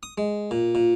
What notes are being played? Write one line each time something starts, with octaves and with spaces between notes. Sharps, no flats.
D#6
G#3
A#2
A#2